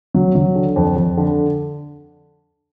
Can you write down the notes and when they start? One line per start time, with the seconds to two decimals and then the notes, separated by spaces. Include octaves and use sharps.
0.14 F#3
0.35 F#3
0.55 D3
0.76 F2
0.96 F2
1.17 D3